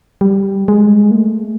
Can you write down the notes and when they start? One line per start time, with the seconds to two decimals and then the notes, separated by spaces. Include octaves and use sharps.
0.21 G3
0.68 G#3
1.11 A#3
1.17 A3